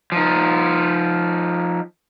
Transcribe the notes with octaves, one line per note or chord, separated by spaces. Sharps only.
F3 D#4